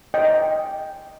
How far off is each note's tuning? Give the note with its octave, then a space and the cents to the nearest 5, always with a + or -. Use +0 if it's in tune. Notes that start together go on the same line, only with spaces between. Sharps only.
D#5 +5 G5 +0